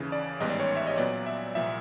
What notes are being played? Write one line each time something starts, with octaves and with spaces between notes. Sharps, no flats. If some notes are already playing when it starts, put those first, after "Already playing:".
Already playing: D#2 C#3 E3
D5
A1 G#2 D#3 G3 B3 D#5
D5
C#5
E5
D#5
A#2 F#3 B3 D5
E5
C2 A#2 F3 E5